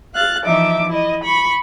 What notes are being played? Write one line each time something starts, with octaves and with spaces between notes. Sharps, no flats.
F5 F#6 A6
E3 F3 D#4 E5 D6
E4 D#5
B5 C#6